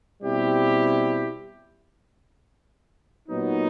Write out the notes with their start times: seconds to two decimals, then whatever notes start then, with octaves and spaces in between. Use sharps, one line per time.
0.22 B2 G3 C4 E4 G4
3.28 A#2 F#3 B3 D#4